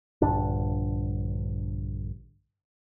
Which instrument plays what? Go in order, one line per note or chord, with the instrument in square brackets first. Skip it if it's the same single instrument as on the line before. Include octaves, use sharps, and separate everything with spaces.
[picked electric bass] A#1 G2 D3 D4